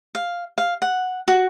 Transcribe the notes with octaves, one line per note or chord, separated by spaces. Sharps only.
F5
F5
F#5
F#4